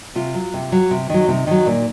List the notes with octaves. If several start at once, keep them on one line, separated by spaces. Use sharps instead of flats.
C3 F4
F#3
C3
F#3
C3
D#3 F#3
C3 D#4
D#3 F#3
A#2